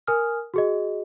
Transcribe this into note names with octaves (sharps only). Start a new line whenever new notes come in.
A#4 G#5 D#6 F6
F#4 G#4 D#5